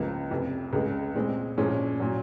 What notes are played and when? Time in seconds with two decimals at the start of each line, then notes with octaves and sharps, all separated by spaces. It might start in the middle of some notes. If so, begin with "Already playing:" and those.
Already playing: C#2 C#3 F3 A#3
0.30 F1 F2 C3
0.73 C#2 C#3 G#3
1.15 A#2 G#3 C4
1.58 A#2 F3 G#3 C#4 G#4
2.00 A#2 F#3